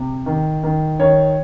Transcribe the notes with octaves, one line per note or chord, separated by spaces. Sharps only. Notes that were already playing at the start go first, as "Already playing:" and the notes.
Already playing: C3
D#3
D#3
D#3 C#5